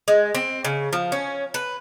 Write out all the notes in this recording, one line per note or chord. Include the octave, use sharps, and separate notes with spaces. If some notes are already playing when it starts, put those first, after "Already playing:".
G#3
C4
C#3
F3
C#4
B4